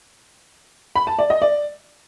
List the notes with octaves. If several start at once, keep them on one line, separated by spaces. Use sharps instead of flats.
B5
A5
D5
D#5
D5